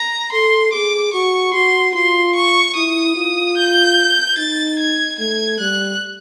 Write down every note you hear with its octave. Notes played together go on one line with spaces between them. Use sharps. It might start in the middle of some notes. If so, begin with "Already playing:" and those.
Already playing: A#5
A4 C6
G#4 D6
F#4 C#6
F#4 C6
F4 C6
C#6
E4 D#6
F4
G6
D#4 A6
G#6
A3 G#6
G3 F#6